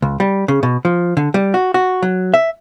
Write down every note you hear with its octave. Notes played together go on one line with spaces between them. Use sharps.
C#2
G3
C#3
B2
F3
D3
G3
F#4
F#4
F#3
E5